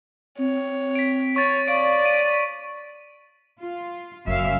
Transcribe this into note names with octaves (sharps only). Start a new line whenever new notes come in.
C4 C#5
B6 D7
C#5 C#6 A6
D5 F5 D7
B6 D#7
F4
F#1 F#2 E5 F5